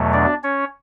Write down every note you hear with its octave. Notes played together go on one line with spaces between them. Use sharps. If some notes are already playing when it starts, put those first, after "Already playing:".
Already playing: E2 B2 F#3 A3
D4 D5
C#4 C#5